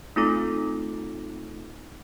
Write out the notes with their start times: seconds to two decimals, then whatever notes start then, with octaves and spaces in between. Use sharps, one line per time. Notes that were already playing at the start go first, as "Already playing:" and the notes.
0.16 A3 C4 D#4 F4 A4 D6